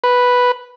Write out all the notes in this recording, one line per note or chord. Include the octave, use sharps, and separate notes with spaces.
B4